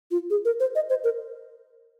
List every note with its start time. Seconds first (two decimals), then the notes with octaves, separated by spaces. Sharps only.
0.11 F4
0.30 G#4
0.45 A#4
0.60 C5
0.75 D#5
0.90 C5
1.04 A#4